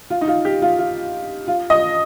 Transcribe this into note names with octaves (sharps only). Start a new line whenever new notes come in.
F4
D#4
F4
G4
F4
F4
F4
D#5